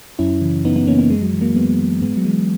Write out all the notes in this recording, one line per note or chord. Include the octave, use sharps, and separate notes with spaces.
F#2 C#4 E4
C#3 E3
F#2 B3 D#4
B3 D#4
C#3 E3 A#3 C#4
A#3 C#4
F#2 G#3
F#3
G#3
E3
F#3 A#3
F#2 G#3 B3
E3
G#2 G#3 B3
F#3
E3 G#3